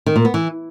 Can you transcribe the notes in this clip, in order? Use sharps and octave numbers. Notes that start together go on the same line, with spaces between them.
D#3
A#2
B3
E3